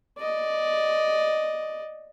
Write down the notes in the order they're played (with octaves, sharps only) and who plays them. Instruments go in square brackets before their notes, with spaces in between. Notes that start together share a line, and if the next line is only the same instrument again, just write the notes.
[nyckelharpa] D5 D#5